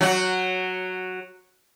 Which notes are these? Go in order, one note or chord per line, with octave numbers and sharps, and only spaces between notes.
F#3 F#4